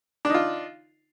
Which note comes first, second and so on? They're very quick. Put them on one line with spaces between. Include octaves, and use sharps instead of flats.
D4 D#4 F4